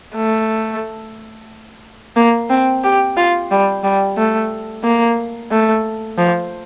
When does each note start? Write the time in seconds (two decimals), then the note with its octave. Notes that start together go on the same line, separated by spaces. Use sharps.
0.16 A3
2.16 A#3
2.50 C4
2.84 G4
3.17 F4
3.51 G3
3.83 G3
4.17 A3
4.84 A#3
5.51 A3
6.18 F3